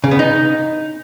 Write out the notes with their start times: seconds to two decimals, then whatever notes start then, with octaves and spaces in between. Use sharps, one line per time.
0.04 C#3
0.11 B3
0.19 D#4